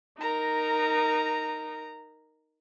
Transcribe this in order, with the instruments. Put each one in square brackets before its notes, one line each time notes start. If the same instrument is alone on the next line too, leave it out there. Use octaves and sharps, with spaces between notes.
[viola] D#4 A#4 [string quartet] A#5